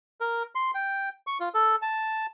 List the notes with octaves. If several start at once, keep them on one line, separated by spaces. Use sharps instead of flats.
A#4
C6
G5
C#6
F4
A4
A5